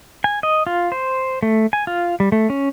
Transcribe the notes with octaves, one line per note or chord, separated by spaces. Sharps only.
G#5
D#5
F4
C5
A3
G#5
F4
G3
A3
C#4